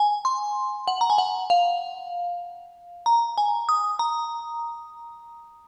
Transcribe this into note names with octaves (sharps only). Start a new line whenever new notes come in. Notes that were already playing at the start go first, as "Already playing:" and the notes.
Already playing: G#5
C6
F#5
A#5
G#5
F#5
F5
A#5
G#5
D#6
A#5